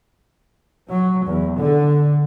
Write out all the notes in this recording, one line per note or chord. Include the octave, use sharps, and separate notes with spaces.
F#3
E2
D3